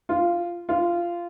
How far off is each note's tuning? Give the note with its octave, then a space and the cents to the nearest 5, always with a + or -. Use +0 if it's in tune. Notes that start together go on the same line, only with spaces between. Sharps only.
F4 -10
F4 -15